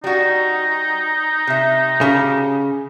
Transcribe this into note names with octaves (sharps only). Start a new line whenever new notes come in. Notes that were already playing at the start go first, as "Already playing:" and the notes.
G3 D#4 F#4
C3 E5
C#3 C#4 F#4 G4